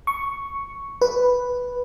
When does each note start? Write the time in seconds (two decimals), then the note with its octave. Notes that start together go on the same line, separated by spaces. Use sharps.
0.07 C#6
1.01 B4